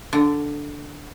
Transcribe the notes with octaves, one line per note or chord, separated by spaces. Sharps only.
D3